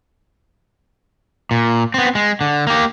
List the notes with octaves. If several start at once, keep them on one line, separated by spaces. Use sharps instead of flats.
A#2
B3 C4
G#3
D3
A#3 G4